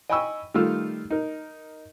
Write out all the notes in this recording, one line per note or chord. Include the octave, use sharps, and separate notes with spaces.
D#5 G5 G#5 B5 C#6 E6
D#3 G3 A3 F4 E6 F6
D#4 A#4